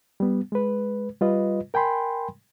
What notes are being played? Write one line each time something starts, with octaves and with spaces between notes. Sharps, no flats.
G3 B3
G#3 B4
G3 F4 B4 D#5
A#4 G5 G#5 B5 C6